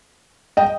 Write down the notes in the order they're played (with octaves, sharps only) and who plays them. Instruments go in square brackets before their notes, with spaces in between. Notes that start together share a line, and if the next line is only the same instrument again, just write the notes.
[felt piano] D#5 G5